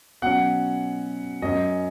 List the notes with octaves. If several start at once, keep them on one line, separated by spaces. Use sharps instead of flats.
B2 F#3 C#4 F#5
F#2 F#3 C#4 D#5